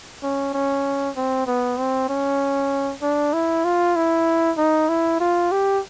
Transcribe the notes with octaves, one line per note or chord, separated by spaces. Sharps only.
C#4
C#4
C4
B3
C4
C#4
D4
E4
F4
E4
D#4
E4
F4
G4